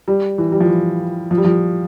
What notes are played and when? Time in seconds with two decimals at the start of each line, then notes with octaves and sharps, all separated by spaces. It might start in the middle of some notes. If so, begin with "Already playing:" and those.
0.08 G3
0.38 E3
0.52 G3
0.60 F3
0.69 E3
1.31 F3
1.37 G3
1.44 F3